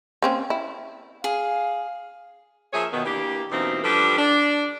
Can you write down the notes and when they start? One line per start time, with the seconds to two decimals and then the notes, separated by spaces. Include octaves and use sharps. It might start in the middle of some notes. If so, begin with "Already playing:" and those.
0.22 A#3 C4 C#4
0.50 E4
1.24 G#4 F5
2.73 F3 A#3 G#4 A#4 C#5 E5
2.92 B2 D#3 B3
3.05 E3 A#3 D4 G4
3.50 F#2 B2 E3 A#3 C4 D#4
3.84 F3 G3 D4 G4 A4 B4
4.18 D4